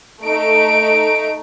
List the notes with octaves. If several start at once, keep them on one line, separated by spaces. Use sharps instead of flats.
A3 D#4 D7